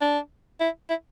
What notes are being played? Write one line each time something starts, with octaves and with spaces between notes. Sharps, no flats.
D4
E4
E4